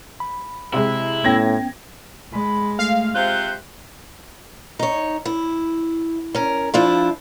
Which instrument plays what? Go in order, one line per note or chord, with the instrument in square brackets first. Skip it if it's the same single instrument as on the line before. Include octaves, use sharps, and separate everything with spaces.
[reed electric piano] B5
[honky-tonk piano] C3 G#3 [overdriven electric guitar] E4
[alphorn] A2 [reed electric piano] B3 C#4 G5 [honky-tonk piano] G#6 A#6
[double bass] G#3 [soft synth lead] B5
[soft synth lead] A3 [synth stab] F5
[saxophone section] C3 F4 C5 [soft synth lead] F#6
[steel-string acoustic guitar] D#4 C#5
E4
C#4 A#4
F3 D4 E4 F4